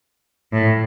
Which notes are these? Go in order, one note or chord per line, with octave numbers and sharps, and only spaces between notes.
A2